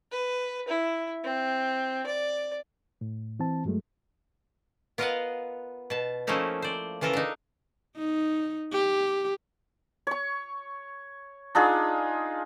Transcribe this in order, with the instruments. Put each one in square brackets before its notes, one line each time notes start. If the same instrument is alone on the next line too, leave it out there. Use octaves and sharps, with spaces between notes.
[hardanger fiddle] B4
E4
C4
D5
[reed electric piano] A2
E3 C4 A5
G2 F#3 G#3 A3
[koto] B3 F4 A#4 D#5 F5 F#5
B2 A5
F3 A3 A#3 C#4 D#4 E4
C5 D5
C#3 E3 F4 A4 A#4
D4 D#4
[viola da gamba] D#4
G4
[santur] C#5 C#6
D4 D#4 F4 G#4